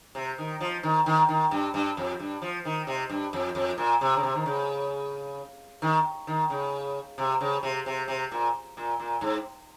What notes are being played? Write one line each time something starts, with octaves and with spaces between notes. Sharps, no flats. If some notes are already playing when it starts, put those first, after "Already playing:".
C3
D#3
F3
D#3
D#3
D#3
G2
G2
F2
G2
F3
D#3
C3
G2
F2
F2
A#2
C3
C#3
C3
D#3
C#3
D#3
D#3
C#3
C3
C#3
C3
C3
C3
A#2
A#2
A#2
G#2